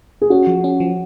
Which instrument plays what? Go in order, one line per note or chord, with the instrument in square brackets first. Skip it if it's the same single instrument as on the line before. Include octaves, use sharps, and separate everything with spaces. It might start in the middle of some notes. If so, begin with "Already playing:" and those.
[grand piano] G#4
[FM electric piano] C#4 [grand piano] F#4
[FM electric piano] F3
C#4
F3